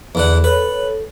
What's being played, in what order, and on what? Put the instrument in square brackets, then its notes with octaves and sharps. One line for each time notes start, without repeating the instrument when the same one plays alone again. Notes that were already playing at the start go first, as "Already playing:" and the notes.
[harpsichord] E2 D3 F#5
[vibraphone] A4 C#5 [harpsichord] B4